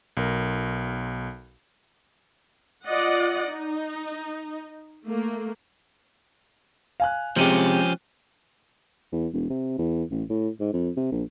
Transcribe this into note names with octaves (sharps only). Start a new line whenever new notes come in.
B1 A#4
F4 D5 D#5 F#5
D#4
A3 A#3
F5 G#5 F#6
C3 F3 G#3 C#4 G4
E2
E1
C3
E2
A1
A2
G#2
F2
C3
A#1